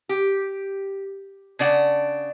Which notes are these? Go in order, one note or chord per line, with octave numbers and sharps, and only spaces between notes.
G4
C#3 D4 D5 F#5